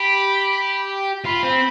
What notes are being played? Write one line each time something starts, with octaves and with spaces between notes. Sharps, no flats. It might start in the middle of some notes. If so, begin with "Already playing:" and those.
Already playing: G4 B5
F4 B5
C4